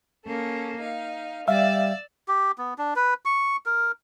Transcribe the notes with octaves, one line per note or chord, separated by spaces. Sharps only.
A#3 C#4 A4
D#4 F5
G3 D5 E5 F5 E6
G4
B3
D4
B4
C#6
A#4